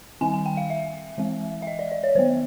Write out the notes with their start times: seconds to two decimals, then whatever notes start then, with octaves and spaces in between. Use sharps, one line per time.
0.21 D#3 G3 C4 G#5
0.34 G#5
0.46 G5
0.57 F5
0.70 E5
1.18 E3 G#3 C4
1.62 E5
1.67 D#5
1.79 D5
1.92 D5
2.03 C#5
2.15 D#3 F#3 B3 C5